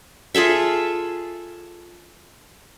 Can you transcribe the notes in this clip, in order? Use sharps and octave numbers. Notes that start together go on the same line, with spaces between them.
F4 G#4 A4 E5